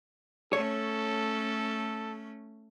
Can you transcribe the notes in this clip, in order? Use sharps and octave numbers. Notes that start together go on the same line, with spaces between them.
A3 C#4 A4 C#5